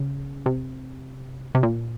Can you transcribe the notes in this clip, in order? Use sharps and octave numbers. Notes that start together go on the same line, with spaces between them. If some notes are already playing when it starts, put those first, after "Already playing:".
Already playing: C#3
C3
C3
A#2